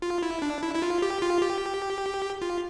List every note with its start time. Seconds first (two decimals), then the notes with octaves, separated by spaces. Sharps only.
0.02 F4
0.23 E4
0.42 D4
0.63 E4
0.75 E4
0.82 F4
1.02 G4
1.22 F4
1.42 G4
2.42 F4